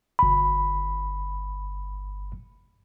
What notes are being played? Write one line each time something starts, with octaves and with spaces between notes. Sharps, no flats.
G1 B5